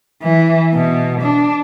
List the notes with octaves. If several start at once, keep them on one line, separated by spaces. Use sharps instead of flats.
E3
B2
D4